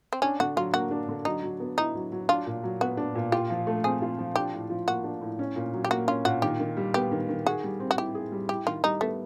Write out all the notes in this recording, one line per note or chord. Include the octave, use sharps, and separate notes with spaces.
C4
C#4 D4
D3 F#4
F#3 F4
A#3 F#4
D4
D3
F#3 D#4
F#3
B3
D#4 E4
F#3
F#3
D4 F4
A#2
F#3
B3 F#4
D4
A#2
F4 G4
F3
A3
C4 G#4
F4
F3
D4 G4
A2
F3
A#3 F#4
D4
A2
C#4
A#2
F#3
G4
A#3 F#4
C#4 F4
A#2 F#4
D#3 G4
D#3
G3
B3 G4
D#3
D#3
F#4 G#4
G3
C4
F#4
E4 G4
G#4
G3
E4 G4
D#3 F4
G3 D#4
A3 B3